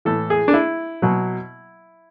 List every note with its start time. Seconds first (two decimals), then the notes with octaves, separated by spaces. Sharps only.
0.05 A2 E3 A4
0.30 G#4
0.48 D4
0.54 E4
1.02 B2 F#3